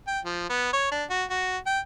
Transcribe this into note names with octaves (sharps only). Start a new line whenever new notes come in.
G5
F3
B3
C#5
D4
F#4
F#4
G5